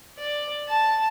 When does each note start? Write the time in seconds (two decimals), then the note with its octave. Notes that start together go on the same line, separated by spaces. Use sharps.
0.18 D5
0.68 A5